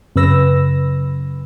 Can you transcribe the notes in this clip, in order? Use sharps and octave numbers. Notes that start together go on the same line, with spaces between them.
F#2 C#3 B4 E6 A#6